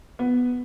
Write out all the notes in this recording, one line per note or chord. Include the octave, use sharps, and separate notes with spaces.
B3